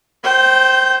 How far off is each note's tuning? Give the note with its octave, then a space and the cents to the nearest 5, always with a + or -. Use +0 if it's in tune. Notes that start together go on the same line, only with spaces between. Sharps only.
C5 +0 G5 -20